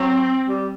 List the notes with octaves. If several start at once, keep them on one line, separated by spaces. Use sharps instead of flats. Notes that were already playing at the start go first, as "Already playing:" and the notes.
Already playing: F#3 C4
G3